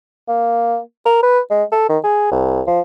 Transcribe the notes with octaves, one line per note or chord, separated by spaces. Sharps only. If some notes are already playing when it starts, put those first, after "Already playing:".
A#3
A#4
B4
G#3
A4
D#3
G#4
C2
F3